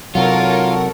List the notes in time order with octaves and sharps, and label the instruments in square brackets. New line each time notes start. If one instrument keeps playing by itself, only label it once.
[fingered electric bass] C3 F#3 [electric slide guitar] F4 [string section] A4 A#4 C#5 [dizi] F#5